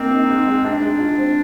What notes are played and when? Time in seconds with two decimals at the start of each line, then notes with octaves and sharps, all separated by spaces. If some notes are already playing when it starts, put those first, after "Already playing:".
Already playing: A#3 C4 D#4
0.11 D#4
0.29 G#2
0.47 G#3
0.64 D4 D#4
0.82 G#3
1.00 F4
1.18 C4